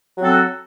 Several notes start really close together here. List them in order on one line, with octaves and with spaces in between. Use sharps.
F#3 C4 A4 F#4